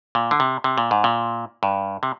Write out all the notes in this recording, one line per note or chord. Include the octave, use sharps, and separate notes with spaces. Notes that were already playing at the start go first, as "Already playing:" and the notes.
A#2
D3
C3
C3
A#2
G#2
A#2
G2
C3